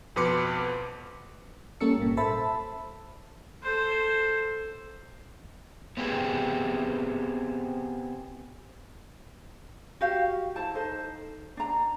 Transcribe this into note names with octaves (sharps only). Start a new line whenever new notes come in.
F2 B2 B4 C6 D6 C#7
G3 A#3 C#4 A4 E6 C#7
G#1 A#2
A4 C5 E5 A5 B5 E6
A4 C5
B3 C4 G4 G#4
F#4 G4 F5
E4 C5 A5
D#4 A4 C5
D4 A#5